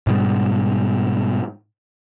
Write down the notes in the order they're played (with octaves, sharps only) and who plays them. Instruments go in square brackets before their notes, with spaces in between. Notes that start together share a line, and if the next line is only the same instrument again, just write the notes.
[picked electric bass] G#2 B2 G3